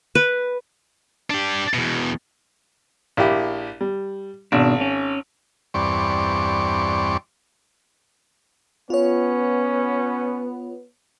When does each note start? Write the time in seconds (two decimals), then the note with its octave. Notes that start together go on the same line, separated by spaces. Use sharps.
0.15 B4
1.30 D4 G4
1.74 E2 B2
3.17 A#1 E4 G4
3.81 G3
4.52 G#1 B2 D4
4.81 C#4
5.74 E2 G2 C4 D5 C#6
8.90 B3 C#4 F4 C#5